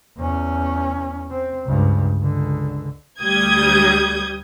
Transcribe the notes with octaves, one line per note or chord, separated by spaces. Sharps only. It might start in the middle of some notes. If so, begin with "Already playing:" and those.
E2 C#4
C4
C#2 G2
C#2 D3
D2 G3 D#6 G6 G#6